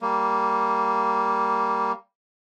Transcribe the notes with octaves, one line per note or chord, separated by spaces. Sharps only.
G3 A#3